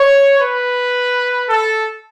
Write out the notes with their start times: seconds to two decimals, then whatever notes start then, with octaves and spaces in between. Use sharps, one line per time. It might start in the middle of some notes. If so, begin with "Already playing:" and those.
Already playing: C#5
0.39 B4
1.48 A4